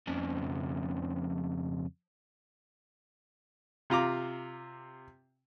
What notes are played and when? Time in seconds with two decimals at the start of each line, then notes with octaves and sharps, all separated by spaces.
0.08 F2 C#3
3.90 C3 F4 A#5 D6